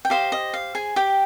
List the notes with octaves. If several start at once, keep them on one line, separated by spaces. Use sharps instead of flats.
G5
G4 C5 D#5 F5
D#5
F5
G#4 G#5
G4 G5